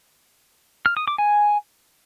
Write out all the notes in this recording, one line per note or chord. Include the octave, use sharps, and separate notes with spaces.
F6
D#6
D6
G#5